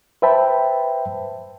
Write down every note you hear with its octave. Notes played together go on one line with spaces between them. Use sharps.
B4 C5 E5 G5 A5 B5